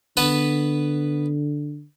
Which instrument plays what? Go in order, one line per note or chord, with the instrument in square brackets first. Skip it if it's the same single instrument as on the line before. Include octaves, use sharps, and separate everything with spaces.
[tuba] D3 [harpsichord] B3 B4 A5